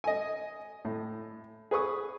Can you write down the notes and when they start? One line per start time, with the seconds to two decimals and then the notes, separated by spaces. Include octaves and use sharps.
0.04 D#5 G#5
0.85 A2
1.71 G#4 B4 C#6 D#6